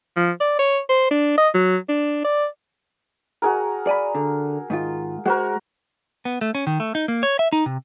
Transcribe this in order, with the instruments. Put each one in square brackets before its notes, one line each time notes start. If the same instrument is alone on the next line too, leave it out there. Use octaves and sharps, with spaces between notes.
[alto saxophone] F3
D5
C#5
C5
D4
D#5
F#3
D4
D5
[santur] F#4 G#4 A#4
[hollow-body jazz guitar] D5 G#5 B5
D3
G#2 D#3 F4
[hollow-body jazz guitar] G#3 C5 [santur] F#4 A#4
[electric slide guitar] B3
A3
C#4
D#3
A3
D#4
A#3
C#5
E5
D#4
C3